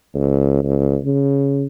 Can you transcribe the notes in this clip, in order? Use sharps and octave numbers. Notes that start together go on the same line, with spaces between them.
C#2
C#2
C#3